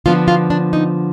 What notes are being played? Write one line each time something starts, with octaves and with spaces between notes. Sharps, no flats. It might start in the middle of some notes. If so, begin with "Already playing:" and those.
D3 F3 B3 D4 F4
F4
D4
D#4